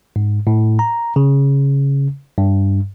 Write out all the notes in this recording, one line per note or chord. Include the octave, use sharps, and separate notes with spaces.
G#2
A2
A#5
C#3
G2